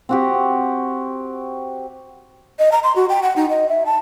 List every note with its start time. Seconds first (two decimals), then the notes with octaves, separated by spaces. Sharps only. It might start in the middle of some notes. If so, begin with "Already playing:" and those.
0.09 C4 F#4 G4
2.59 D#5
2.72 A#5
2.83 C6
2.96 F#4
3.09 G5
3.22 F#5
3.36 D#4
3.50 D#5
3.69 E5
3.86 A5